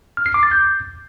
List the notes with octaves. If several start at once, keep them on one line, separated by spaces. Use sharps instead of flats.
F6
C7
D6
A6
G6